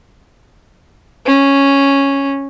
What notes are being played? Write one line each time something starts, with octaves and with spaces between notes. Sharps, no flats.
C#4